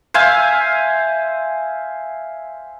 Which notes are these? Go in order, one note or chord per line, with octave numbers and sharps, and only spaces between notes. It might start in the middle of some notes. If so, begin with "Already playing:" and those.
C5 E5 F5 G#5